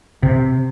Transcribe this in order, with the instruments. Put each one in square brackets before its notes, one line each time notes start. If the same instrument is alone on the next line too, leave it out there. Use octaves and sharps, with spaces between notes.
[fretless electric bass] C3